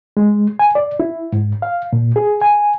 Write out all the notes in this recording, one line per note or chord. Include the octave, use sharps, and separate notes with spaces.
G#3
G#5
D5
E4
G#2
F5
A#2
G#4
G#5